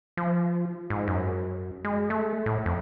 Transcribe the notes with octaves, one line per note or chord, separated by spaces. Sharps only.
F3
G#2
F#2
G#3
A3
A2
F2